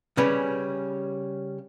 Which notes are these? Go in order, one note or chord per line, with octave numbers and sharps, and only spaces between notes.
C#3 G3 C#4 B4